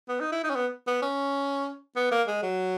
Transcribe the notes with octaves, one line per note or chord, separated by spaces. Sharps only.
B3
D#4
E4
D#4
C#4
B3
B3
C#4
B3
A#3
G#3
F#3